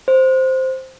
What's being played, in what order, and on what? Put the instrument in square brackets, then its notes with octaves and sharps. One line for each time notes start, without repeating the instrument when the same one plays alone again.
[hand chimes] C5